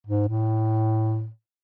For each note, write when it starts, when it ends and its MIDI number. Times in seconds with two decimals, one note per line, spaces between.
0.07 0.27 44
0.28 1.28 45